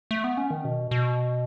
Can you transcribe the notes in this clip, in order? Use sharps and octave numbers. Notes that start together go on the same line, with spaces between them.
A3
B3
C#4
D#3
B2
B2